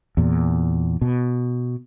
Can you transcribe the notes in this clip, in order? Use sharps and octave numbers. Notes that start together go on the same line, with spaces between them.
E2 A#2
B2